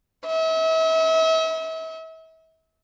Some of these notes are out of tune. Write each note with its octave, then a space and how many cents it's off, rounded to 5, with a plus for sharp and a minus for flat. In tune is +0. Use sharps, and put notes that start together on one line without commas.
E5 -40